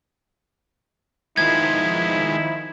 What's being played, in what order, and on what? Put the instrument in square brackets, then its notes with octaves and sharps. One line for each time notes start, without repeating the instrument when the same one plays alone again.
[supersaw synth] D#3 F3 D#4 [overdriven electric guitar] G#3 B3 [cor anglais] E4 [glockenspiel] G#6